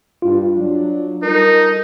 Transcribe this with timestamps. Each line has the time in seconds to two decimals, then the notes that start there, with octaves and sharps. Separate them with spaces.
0.22 G2 G3 F4
0.56 F#3 D4
1.23 G3 D#4 A4 A#4